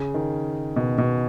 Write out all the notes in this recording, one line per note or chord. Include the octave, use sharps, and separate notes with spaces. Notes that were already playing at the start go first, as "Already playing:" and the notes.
Already playing: C#3
D#3
B2
B2